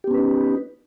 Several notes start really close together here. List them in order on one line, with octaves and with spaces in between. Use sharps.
G4 B3 C#4 B4 D#4